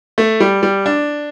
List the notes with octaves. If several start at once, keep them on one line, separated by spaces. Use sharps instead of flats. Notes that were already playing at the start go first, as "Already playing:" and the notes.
A3
G3
G3
D4